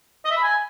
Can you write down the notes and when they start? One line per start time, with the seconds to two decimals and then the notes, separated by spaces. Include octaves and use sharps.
0.25 D#5
0.31 E5
0.37 B5
0.43 G#5